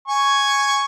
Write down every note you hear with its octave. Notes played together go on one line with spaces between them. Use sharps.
G#5 C#6